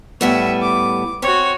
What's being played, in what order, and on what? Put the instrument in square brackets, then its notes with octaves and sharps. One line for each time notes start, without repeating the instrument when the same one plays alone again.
[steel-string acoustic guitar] A2 G3 B3 [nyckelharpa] E5
[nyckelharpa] D6
[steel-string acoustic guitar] C4 [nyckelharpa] F#4 C#5